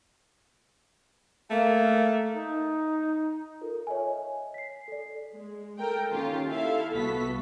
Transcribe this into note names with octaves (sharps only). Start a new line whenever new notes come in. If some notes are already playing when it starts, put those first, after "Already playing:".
A3 A#3
D#4
F4 A4 A#4
C#5 D#5 E5 G#5
B6 C7
A4 D5
G#3
A4 A#4 G5
D#3 A#3 C#4 F4 G4
E4 A4 E5 F5
C2 B3 F#4 A4 B6